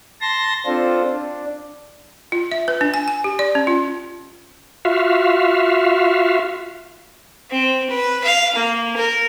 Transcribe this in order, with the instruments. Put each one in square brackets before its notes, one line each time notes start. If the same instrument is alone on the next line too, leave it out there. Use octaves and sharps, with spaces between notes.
[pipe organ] A5 C6 A#6
C4 D4 F4 A4 C5
D4
[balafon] F4
E5
B4
D4
G#5
G#5
G4
D5
C#4
F4
[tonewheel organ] F4 F#4 E5 F5
[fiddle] C4
B4
F5
A#3
A#4